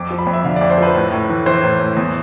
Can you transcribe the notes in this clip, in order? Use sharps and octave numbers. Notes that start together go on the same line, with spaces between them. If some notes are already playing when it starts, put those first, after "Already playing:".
Already playing: F2 D6
F3
B5
F2
E5
D3 F5
D5
F2
C5
F3 B4
A2
A2
E3
E3 C5
A2
A2
E2